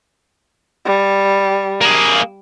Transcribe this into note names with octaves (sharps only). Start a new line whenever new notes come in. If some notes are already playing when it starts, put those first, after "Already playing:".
G3
A#3 G#4